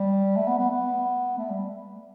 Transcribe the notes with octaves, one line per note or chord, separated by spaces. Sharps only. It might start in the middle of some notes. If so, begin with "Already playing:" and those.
Already playing: G3
A3
B3
B3
B3
A3
G3